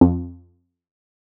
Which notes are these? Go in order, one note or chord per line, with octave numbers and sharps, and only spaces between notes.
F2